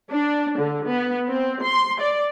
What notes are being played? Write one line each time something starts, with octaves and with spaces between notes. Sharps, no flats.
D4
D3
B3
C4
C6
D5